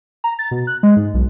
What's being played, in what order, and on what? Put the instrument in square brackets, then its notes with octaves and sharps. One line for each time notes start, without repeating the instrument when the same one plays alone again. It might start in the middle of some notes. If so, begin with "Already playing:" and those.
[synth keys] A#5
A6
B2
F#6
G#3
G#2
B1